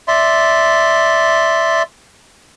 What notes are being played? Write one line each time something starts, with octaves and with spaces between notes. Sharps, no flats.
D5 E5 C6